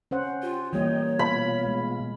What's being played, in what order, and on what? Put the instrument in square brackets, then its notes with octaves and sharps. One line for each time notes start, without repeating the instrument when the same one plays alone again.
[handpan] C#4 C5 F#5
[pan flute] F4 [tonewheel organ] G4
[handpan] E3 G3 A#3 [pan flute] C#5 [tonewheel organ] D#5 G5
[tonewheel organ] B2 F4 [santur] B5
[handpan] G#3